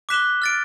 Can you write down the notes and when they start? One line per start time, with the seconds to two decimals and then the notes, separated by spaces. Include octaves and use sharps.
0.09 D6 F#6 B6 E7 G7
0.42 F6 A6 D7